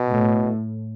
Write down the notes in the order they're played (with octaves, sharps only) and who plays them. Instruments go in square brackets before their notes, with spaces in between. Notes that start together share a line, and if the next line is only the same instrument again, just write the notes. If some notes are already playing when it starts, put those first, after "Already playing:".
Already playing: [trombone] B2
[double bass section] A2